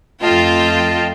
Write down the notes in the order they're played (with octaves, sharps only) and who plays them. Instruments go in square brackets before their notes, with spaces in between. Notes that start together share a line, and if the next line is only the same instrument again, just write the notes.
[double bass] F2 A3 [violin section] F4 G5 [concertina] D#5 A5